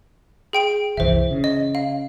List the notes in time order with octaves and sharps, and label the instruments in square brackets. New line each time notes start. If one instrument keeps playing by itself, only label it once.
[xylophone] G#4 G5 D7
[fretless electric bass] F#1 C2 E3 [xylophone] C5 E5
[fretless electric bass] C#3
[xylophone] D#5
F5